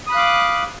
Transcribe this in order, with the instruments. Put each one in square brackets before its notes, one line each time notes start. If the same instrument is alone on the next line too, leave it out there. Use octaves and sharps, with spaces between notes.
[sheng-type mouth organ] D#6
B5
F#6
F5
D6